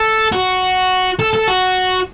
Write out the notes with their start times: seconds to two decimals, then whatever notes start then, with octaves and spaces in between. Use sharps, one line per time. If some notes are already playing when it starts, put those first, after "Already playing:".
Already playing: A4
0.33 F#4
1.19 A4
1.33 A4
1.48 F#4